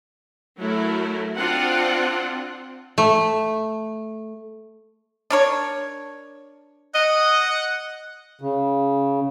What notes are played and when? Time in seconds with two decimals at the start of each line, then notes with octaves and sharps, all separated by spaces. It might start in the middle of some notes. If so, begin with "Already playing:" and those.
0.58 F#3 A3 E4 A#4
1.36 C4 D4 F4 F#5
2.98 A3
5.30 D4 A#4 C#5
6.95 D#5 F#5
8.41 C#3